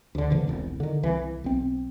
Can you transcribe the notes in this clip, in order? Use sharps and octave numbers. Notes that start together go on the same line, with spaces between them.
D2 D3
F#1 C#3 E3 F3
E1 C2
D3 D#3
C2 E3
B1 C4